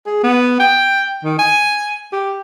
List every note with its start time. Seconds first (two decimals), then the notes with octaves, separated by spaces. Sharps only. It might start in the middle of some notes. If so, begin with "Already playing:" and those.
0.06 G#4
0.23 B3
0.59 G5
1.24 D#3
1.39 G#5
2.13 G4